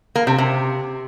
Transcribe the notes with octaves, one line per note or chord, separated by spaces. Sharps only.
A#3
C3
C3